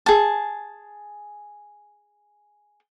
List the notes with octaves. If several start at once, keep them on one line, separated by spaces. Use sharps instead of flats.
G#4 A5